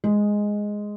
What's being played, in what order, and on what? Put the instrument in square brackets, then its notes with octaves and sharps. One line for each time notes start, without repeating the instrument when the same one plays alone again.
[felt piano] G#3